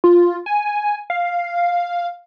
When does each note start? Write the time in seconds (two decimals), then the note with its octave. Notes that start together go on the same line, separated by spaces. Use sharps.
0.04 F4
0.46 G#5
1.10 F5